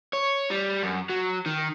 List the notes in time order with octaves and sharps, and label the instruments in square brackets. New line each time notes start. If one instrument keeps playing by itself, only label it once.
[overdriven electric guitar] C#5
G3
F#2
F#3
D#3